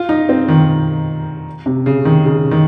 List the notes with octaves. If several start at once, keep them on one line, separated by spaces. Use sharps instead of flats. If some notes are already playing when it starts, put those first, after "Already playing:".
Already playing: F4
D#4
C4
D#3
C3
C#3
D#3
C#3
D#3